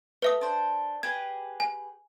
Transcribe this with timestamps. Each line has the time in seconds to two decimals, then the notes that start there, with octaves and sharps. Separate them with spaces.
0.22 A3 B4 E5 D#6
0.41 D4 C5
1.03 G4 G#4 B4 G#6
1.60 G#5